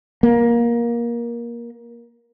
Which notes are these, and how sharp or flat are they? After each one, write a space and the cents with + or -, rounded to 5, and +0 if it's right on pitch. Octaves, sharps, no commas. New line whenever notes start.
A#3 +20